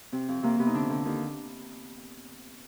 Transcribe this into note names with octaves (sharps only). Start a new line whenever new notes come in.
C3 C4
F2
C3 A#3
C3 B3
D#4
D3 D4
D3
D#2